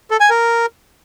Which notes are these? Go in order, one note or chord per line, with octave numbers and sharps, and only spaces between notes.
A4
G#5
A#4